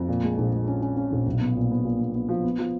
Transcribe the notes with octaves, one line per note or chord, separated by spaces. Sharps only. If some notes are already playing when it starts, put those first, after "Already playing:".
Already playing: F2
A#2
G#3
A#1
G#3
C#4
C#4
C#4
A#1
B1
B3
A#2
B3
A#2
B3
B3
F3
B3
F3